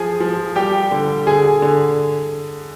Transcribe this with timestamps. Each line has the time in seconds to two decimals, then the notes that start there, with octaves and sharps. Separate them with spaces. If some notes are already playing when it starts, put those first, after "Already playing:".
Already playing: F3 G#4 G#5
0.20 F3
0.56 G3 G4 G5
0.91 D3
1.27 D3 G#4 G#5
1.62 D3